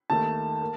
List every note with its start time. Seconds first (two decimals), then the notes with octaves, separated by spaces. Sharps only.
0.10 D#2 D#3 A3 A5
0.61 A#3